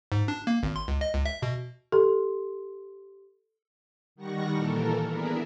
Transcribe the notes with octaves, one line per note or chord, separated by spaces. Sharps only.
G#2
D4
A#3
G#1
C6
C#2
D#5
C#2
E5
B2
G4 A4 C6
D#3 G3 F#5 C#6 A#6
A#2 E3 A4 A#4
B3 D4 E4 G#4 A#4 E5